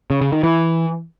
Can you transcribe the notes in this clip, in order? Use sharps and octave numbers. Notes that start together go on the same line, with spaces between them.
C#3
C#3
D#3
E3